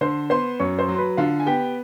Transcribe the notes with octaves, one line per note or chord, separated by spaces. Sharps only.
D3 C5 C6
B3 C5 C6
F#2 C#5 C#6
C5 C6
F#3
C6
B4 B5
D3 F4 F5
G#5
B3 G4 G5